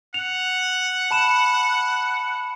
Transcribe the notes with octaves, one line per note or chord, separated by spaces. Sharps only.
F#5 F7
A5 B5 E7